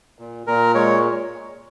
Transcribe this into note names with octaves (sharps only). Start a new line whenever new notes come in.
A#2
A#2 A#4
G#3 C#5